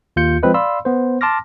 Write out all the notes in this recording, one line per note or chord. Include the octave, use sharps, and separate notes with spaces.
D#2 F4 G6 C#7
F3 G#3 C4 B4 D#5
D5 F5 B5 C6 E6
B3 C5
A5 C6 D6 F6 A#6